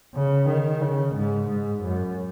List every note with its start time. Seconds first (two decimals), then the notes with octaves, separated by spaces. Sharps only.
0.15 C#3
0.49 D#3
0.81 C#3
1.16 G#2
1.48 G#2
1.82 F#2